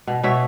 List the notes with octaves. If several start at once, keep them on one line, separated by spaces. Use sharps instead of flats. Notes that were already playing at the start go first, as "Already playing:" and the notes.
B2
B2 C#5 E5